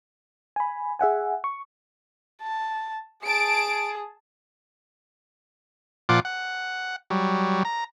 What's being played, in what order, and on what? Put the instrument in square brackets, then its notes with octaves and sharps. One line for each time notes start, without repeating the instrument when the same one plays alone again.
[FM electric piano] G#5 B5
G#4 E5 F#5 G#5
C#6
[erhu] A5
[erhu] G#4 [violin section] A5 D7
[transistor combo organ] A#2 F3 F4 D5 F#5 D6
F#5
F#3 G3
A#5